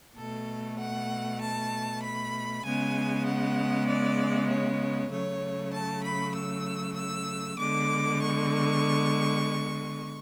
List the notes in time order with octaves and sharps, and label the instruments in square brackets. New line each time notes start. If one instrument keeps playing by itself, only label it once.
[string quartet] B2 A3 A4
F#5
A5
B5
C#3 G#3 B3 G#5
F#5
D5
C#5
C#3 F#3 A3 C#5
A5
B5
E6
E6
D3 G#3 B3 D6
C#6